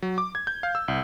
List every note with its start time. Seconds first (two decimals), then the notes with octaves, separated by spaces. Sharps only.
0.02 F#3
0.18 D6
0.35 G#6
0.47 G6
0.63 F5
0.75 E6
0.88 C2